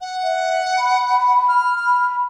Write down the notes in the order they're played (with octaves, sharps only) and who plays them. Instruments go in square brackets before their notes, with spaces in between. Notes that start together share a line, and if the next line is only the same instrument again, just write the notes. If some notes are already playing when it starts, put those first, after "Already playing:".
[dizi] F#5
[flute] E5
B5
[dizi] F6
[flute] B5